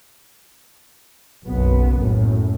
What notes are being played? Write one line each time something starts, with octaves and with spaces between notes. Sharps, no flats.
F#1 B1 B3
F#2 A2